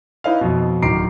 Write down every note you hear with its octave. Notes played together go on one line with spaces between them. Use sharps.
D#4 E4 B4 C#5 D#5 F5
F2 B2
D1 D#3 A#5 D6 C7 D7